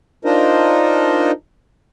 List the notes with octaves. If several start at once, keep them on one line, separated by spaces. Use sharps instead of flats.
D4 D#4 F4 A#4 C5 D#5